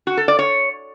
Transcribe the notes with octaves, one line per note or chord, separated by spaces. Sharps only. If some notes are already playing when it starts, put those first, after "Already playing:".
F#4
A4
D5
C#5